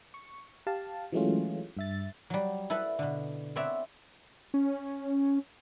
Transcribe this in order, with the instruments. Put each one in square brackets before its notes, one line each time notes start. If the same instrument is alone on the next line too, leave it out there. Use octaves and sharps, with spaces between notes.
[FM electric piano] C#6
G4 F5 A5
E3 F#3 G#3 A3 C#4 F4
G2 E5 A6
[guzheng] F#3 G3
E4 A4 B4 F#5
B2 D3
B3 C4 F#4 C#5 D5 E5
[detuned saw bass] C#4